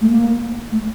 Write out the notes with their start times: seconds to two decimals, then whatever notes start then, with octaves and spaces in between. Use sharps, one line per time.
0.01 A3
0.10 A#3
0.72 A3